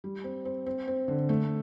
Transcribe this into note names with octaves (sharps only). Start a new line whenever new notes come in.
G3
C4
C4
C4
C4
D3
A3